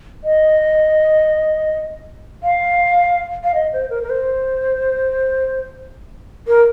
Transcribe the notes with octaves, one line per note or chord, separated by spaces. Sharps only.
D#5
F5
F5
D#5
C5
A#4
A#4
C5
A#4